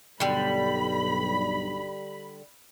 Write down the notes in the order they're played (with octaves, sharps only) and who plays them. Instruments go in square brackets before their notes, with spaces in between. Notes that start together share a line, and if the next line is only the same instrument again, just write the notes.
[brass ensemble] B1 G2 [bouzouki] D3 G3 [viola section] B5